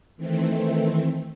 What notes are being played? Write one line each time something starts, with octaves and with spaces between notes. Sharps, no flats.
D#3 E3 A3 C4